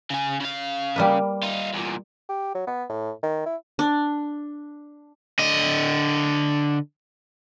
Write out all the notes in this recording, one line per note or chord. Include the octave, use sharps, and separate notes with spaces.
C#3 G#5
C#3 F5
G3 A#3 B4
D#4 F4
E2 A#2
G4
F#3
B3
A2
D#3
E4
D4
D3 D#5